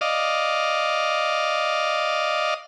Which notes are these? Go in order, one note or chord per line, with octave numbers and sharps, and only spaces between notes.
D5 D#5 F5